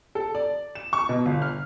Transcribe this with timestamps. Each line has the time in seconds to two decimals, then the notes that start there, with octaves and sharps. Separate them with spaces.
0.15 A4
0.35 D5
0.75 E7
0.93 C#6
1.09 B2
1.26 G1
1.42 F6